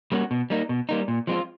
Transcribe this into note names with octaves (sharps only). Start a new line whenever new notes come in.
G3 A#3 C#4 F#4
B2
G3 A#3 D#4
B2
G3 A#3 D#4
A#2
F3 G#3 C4 F4